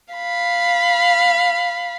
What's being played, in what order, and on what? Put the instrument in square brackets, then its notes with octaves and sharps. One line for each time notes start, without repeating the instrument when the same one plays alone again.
[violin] F5 B5